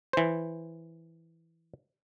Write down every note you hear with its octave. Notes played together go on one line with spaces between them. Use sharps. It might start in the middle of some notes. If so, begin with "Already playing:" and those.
E3 C5